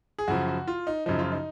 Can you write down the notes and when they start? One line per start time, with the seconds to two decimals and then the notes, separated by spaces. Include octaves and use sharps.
0.19 G#4
0.28 F#2 C#3 F3 F#4
0.48 F#4
0.67 F4
0.87 D#4
1.06 F#2 C#3 F3 D#4
1.19 F4
1.32 D#4